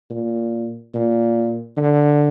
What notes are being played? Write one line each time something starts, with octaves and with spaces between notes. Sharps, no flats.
A#2
A#2
D3